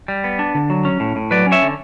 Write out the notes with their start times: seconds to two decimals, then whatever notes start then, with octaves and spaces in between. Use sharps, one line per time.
0.08 G3
0.24 B3
0.39 D4
0.55 D3
0.70 F#3
0.85 C#4
1.00 A2
1.16 A2
1.31 F#3 B4 D5
1.46 C#4
1.52 C#5 E5
1.62 D3